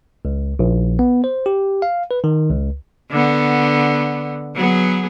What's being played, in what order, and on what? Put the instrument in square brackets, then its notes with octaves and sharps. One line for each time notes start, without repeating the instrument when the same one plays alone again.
[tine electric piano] C#2
A#1
B3
C5
G4
F5
B4
D#3
C#2
[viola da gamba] D3 B3
F#3 B3 G#4